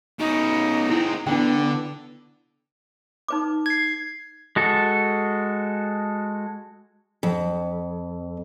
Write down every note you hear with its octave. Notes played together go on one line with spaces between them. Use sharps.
B2 C#4 D#4
G#3 C4 E4
D3 B3 D4 G5
D#4 B4 D6
G#6 C7
G#3 F#4 A4
F2